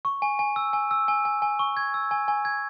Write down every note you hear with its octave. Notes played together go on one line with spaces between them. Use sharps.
C#6
G#5
G#5
E6
G#5
E6
G#5
G#5
G#5
C#6
G#6
E6
G#5
G#5
G#6